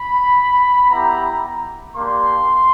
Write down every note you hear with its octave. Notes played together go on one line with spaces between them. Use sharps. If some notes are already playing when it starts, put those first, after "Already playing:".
Already playing: B5
B3 E4 G4 A#5
A#3 D4 G4 C6